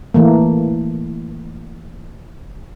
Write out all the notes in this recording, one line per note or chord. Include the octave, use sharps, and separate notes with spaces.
E3 A3 A#3